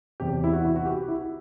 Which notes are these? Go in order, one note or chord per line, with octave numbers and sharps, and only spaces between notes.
E2 C3 F#3 G4
E4
F#4
E4
F#4
G4
E4